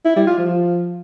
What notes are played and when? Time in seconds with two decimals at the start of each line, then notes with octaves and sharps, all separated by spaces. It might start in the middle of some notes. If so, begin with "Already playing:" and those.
0.05 E4
0.16 G3
0.27 F4
0.38 F3